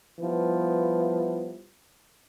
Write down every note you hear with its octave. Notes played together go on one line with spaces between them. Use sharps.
F3 G3 B3 E4 B4